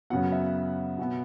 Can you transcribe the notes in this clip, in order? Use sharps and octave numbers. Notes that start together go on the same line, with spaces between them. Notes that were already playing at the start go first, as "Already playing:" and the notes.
F#2 C#3 F#3 B3 F#5
E5
B2 B3